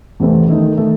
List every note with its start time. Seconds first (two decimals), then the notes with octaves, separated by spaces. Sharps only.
0.20 E2 C3 E3 A3 C4
0.48 D#3 A3 D#4
0.78 D#3 A3 D#4